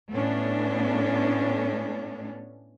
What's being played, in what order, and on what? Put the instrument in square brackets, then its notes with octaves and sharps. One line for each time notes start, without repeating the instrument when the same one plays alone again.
[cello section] A2 A3 B3 C#4 D4